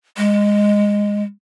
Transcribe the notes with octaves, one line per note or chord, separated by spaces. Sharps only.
G#3